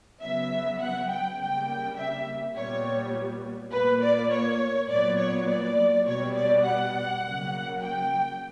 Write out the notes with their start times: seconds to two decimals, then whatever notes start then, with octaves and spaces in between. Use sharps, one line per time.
0.21 C#3 F#3 B3 E5
0.80 F#5
1.09 G5
1.38 C#3 G3 A#3 G5
1.97 E5
2.55 A#2 G3 B3 C#5
3.72 A#2 A#3 B4
4.02 D5
4.31 C#5
4.90 A#2 F#3 B3 D5
5.19 C#5
5.48 D5
6.06 B2 G3 B3 C#5
6.36 D5
6.66 F#5
7.23 C#3 F#3 A#3
7.82 G5